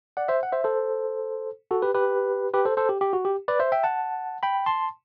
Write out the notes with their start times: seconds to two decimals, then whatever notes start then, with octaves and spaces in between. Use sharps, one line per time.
0.17 D5 F#5
0.28 C5 E5
0.43 F#5
0.52 C5 E5
0.64 A4 C5
1.71 F#4 A4
1.82 G4 B4
1.95 G4 B4
2.54 G4 B4
2.65 A4 C5
2.77 A4 C5
2.89 G4
3.01 G4
3.13 F#4
3.25 G4
3.48 B4 D5
3.60 C5 E5
3.72 E5 G5
3.83 F#5 A5
4.43 G5 B5
4.66 A5 C6